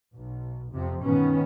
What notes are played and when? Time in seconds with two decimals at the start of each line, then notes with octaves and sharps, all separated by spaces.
0.16 B1
0.73 F2 C3 F3 C4
1.03 G2 B2 D#3 G#3 B3 C#4